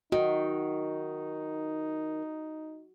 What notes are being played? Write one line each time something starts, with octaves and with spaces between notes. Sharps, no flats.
D#3 D#4 F#4